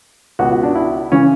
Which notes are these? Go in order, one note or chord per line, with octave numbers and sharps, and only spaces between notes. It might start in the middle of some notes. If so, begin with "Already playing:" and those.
C#2 B2 F#4
F#4
D4
E4
C#3 E3 C#4